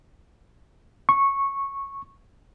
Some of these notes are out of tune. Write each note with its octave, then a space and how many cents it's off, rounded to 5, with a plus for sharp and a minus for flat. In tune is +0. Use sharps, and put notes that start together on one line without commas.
C#6 -10